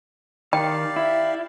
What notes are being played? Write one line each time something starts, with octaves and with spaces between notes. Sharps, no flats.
D#3 G4 D5 F5 G5
E4